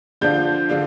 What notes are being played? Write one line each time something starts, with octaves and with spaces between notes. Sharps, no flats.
D3 F3 D4 F4 G6
D3 F3 D4 F4